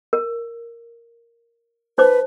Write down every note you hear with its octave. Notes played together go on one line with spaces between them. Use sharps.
A#4
D#4 B4 C5 D6